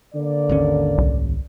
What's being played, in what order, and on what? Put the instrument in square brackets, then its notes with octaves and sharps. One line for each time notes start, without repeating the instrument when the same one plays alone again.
[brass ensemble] D3 A#3 D5
[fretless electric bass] G#1 D#2 C#4
[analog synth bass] C2